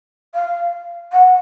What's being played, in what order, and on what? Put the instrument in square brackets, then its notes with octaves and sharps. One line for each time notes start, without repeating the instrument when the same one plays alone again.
[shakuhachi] F5
F#5